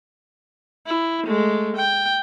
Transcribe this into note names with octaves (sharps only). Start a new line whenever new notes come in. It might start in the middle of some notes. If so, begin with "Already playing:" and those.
E4
G#3 A3
G5